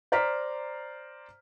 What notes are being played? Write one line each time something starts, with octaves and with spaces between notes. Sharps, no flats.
C5 D5 A#5 F6 B6